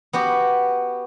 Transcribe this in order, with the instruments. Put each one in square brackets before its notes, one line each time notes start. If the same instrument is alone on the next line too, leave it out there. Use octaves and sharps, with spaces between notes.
[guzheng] B3 F#4 G4